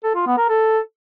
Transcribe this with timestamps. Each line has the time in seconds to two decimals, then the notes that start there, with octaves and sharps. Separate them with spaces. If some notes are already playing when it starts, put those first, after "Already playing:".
0.04 A4
0.15 F4
0.26 B3
0.37 A#4
0.49 A4